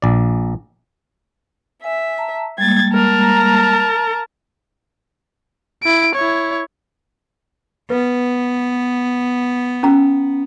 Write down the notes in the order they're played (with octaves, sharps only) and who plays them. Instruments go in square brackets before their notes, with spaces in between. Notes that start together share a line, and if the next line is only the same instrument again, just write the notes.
[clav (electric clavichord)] A#1 D5
[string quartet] E5 [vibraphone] G#5
[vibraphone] A5 A#5
[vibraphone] G3 G#3 A#3 [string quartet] G#6 A6
[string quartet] A#4 A5 A#5
[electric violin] E4 D7
E4 C#5
[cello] B3 [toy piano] B4
[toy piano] C#4 A#5